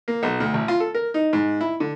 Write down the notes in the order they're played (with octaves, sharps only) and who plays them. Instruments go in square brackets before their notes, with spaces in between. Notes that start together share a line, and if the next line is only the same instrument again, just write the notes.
[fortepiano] A#3
B1
D2
A1
F4
A4
A#4
D#4
G#2
E4
D3